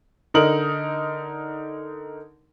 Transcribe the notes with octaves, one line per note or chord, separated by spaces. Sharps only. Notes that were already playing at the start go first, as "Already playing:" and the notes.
D3 D#4 A#4 F#7